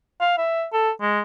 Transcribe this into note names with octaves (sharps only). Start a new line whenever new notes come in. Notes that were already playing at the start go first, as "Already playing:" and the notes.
F5
E5
A4
G#3